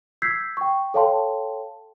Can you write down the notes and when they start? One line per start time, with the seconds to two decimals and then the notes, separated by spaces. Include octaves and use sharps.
0.22 E6 G6 G#6 B6 C7
0.57 G5 C#6
0.94 A4 C#5 F5 G5 A5 C6